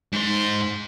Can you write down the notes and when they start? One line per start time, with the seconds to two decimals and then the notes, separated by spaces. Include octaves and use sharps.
0.13 G#2 C5